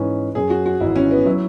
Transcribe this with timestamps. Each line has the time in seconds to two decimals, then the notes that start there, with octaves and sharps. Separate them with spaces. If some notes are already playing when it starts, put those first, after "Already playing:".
Already playing: G#2 E3 C#4 B4
0.35 F#2 F#3 C#4 G#4
0.50 F#4
0.66 F#4
0.80 G#1 G#2 E3 E4
0.96 C#4
1.11 B3
1.26 F#3 E4